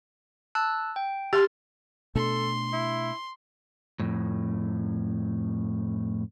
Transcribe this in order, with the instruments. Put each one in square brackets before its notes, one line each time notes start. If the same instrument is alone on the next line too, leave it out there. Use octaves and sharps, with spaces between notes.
[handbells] A5 E6 F#6
G5
[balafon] G4 [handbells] C6 F6 A6
[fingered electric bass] B2 A3 D4 [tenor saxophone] A4 [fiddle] C6
[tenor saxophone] E4
[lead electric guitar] F2 A2